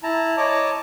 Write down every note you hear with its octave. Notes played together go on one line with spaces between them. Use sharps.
E4 A5 A#5
C#5 D#5 A5 A#5 D6